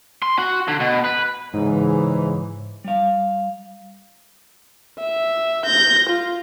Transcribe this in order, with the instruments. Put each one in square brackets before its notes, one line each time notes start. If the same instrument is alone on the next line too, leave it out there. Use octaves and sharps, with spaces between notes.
[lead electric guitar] C6
F#4
D3
B2
B4
[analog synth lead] G#2 [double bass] C#3 E3
[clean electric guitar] G3 F5
[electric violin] E5
G6 A#6
F4